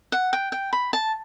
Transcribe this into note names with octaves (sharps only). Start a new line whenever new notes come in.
F#5
G5
G5
B5
A5